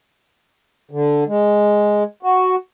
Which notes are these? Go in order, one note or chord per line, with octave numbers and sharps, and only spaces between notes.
D3
G#3
F#4